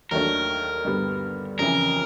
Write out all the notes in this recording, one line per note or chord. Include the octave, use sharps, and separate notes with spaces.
D#2 D#3 F#3 A3 D4 A#4
G2 D3 G3 B3
F2 C#3 E3 A#4